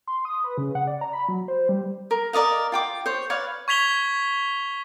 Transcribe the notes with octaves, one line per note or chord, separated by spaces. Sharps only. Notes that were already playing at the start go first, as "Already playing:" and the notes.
C6
D#6
B4
C#3
F#5
D5
A#5
B5
F#3
C5
G3
A#4
A#4 D5 D#5 F5
F4 G5 D6
C5 C#5
B4 C#5 D5 F5
C#6 G#6 B6 F7 G7